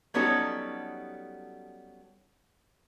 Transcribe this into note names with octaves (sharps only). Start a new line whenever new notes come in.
F#3 G3 B3 C#4 D#4 A4